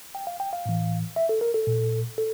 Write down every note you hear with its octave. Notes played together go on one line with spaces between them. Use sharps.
G5
F5
G5
F5
A2 E3
E5
A4
A#4
A4
A#2
A4